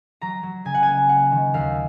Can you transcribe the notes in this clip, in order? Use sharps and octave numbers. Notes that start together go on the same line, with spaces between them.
F#3 A#5
F#3
C#3 G#5
F#5
A#3 G#5
A#3 F#5
D#3
D#2 F5